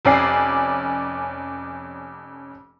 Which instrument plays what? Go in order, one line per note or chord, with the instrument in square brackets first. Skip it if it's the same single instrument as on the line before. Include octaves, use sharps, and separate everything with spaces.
[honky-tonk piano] F1 F2 C#4 D5 G#5 C7